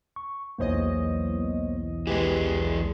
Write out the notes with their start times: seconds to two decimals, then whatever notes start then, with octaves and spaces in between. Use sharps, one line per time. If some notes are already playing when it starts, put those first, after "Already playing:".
0.16 C#6
0.59 B1 E2 A#3 C5 C#5 D#5
2.07 E3 G#3 G4 G#4 B4